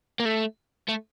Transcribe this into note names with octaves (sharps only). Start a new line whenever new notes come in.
A#3
A3
A3